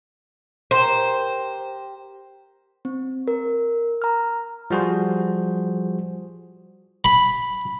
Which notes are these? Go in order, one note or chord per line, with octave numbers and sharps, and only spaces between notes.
G4 A#4 C5
C4
A#4
A#5 F6
F3 G3 F#4 G#4 C5
B5